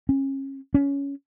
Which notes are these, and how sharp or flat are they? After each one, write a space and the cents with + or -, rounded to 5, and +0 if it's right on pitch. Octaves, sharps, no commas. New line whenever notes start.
C#4 -30
C#4 +15